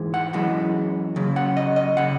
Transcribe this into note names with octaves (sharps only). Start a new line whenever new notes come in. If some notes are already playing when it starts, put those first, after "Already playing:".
Already playing: G#2 E3 G#3
F#5
F#2 E3 G#3
F#2 C#3
F#5
D#5
D#5
C#3 F#5